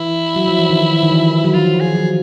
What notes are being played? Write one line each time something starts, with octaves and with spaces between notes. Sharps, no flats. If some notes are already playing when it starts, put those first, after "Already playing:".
Already playing: E3 E4
F#3
F3
E3
D#3
D#3
E3
F#3
F3 F4
G#4
F#3